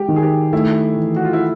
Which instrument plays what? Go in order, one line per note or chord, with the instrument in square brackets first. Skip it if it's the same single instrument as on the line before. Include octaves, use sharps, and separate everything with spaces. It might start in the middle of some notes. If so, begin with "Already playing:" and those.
Already playing: [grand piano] G#3 [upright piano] G4
[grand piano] D#3
[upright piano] G#4
G4
[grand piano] A3 [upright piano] E4
[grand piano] E3
[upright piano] F#4
F4
E4